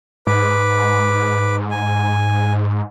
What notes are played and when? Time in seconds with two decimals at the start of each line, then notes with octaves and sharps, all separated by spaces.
0.27 G#2 B4 D6
1.71 G#5